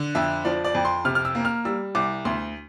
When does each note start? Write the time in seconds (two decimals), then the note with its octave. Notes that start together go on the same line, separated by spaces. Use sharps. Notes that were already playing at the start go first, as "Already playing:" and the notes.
Already playing: D3
0.15 F2 E5
0.45 F3 D5
0.64 D5
0.75 F2
0.85 C6
1.05 C3 F6
1.15 F6
1.25 E6
1.35 A#3
1.45 F6
1.65 G3 E6
1.95 C2 D6
2.25 D2 C6